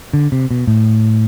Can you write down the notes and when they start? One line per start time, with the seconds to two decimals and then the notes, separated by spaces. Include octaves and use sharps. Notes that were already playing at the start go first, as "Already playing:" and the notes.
0.14 D3
0.32 C3
0.51 B2
0.68 A2